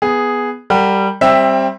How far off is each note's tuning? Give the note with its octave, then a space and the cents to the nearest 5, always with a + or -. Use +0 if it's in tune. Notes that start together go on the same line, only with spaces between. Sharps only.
B3 +0 G#4 +0
G3 +0 A#4 -35 F#5 +0
G3 +0 C4 +20 E5 +0